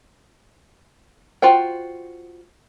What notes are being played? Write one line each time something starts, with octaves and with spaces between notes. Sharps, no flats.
F4 F#4 C5 G5